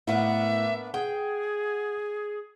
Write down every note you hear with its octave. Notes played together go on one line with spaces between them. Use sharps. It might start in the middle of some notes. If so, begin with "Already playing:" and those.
A2 A#3 B3 D4 E5
G#4 F#5 G5